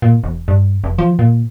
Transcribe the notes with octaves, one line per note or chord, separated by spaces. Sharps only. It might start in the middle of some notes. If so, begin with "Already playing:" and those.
A#2
E1
G2
F1
F3
A#2